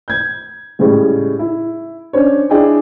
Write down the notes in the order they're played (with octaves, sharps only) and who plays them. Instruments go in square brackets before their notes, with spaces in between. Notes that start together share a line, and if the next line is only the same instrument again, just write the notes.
[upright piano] G6 G#6
A2 C#3 G3 G#3
E4
C#4 D4 C5 C#5
D4 E4 G#4 D#5 G5 G#5